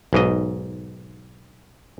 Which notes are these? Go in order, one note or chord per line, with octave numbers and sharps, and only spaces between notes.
B1 G#2 D#5